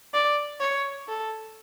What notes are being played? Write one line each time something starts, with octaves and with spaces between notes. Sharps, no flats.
D5
C#5
A4